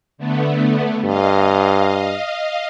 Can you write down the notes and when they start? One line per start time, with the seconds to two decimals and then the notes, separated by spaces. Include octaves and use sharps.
0.18 D3 A3 B3
1.04 G2 D#5 F5